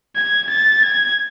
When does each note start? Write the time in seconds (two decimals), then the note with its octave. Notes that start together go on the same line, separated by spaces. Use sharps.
0.16 G#6
0.50 A6
0.83 G#6